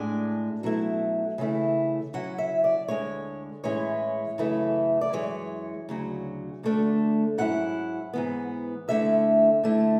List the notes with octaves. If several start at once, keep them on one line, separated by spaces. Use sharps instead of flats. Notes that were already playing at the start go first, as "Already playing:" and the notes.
Already playing: A2 G#3 D4 G#5
B2 F#3 A3 E4
C#3 E3 A3 E4
C#3 F#3 C#4 E4 F#5
E5
D5
D2 D3 G#3 C#5
A2 E3 G#3 C#4 E4 C#5
F#2 C#3 E3 A3 E4
D5
F#2 E3 G#3 C#5
D2 C#3 F#3
D2 D3 A3 D4
G#2 F#3 C#4 E4 F#5
G#2 E3 B3
D2 D3 A3 E4 E5
D3 A3 E4